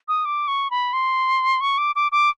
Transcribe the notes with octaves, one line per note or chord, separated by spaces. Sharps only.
D#6
D6
C#6
B5
C6
C#6
D6
D6
D6